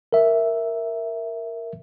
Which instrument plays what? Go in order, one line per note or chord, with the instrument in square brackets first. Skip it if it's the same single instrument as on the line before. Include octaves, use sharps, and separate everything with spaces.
[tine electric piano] A#4 E5